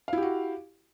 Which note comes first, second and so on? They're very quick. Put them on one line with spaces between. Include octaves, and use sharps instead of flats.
F5 E4 G4 F#4